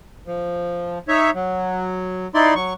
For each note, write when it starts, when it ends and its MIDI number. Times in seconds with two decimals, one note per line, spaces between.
0.27 0.99 53
1.08 1.31 63
1.08 1.31 73
1.08 1.31 76
1.35 2.28 54
2.34 2.54 63
2.34 2.54 64
2.34 2.54 74
2.34 2.54 84
2.55 2.73 54
2.55 2.73 85